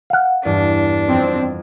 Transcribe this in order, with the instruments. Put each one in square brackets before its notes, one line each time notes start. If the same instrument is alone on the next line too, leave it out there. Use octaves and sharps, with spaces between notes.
[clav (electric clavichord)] F5 F#5
[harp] E2 G2 [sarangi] D4
[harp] F2 [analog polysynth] C4